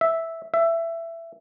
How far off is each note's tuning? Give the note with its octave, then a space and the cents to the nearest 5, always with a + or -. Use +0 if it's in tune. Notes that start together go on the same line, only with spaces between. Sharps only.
E5 -5
E5 +15